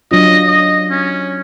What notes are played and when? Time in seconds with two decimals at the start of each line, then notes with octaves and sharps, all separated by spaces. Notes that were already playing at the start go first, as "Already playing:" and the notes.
0.11 F#3 D4 F4 D#5
0.47 D#5
0.91 C#4